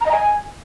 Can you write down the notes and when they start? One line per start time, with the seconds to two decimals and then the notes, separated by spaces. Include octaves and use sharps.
0.01 A#5
0.06 D#5
0.11 G#5